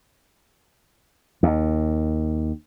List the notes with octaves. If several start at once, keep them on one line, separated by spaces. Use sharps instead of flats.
D#2